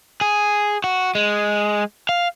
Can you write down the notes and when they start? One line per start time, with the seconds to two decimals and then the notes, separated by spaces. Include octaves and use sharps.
0.21 G#4
0.84 F#4
1.15 G#3
2.09 F5